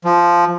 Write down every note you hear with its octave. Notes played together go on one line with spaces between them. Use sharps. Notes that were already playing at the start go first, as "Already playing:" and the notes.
F3